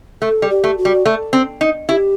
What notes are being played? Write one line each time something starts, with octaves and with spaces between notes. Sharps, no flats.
A3 A4
G3
G4
A3
F#4
G3
A3
C4
D#4
E4 G4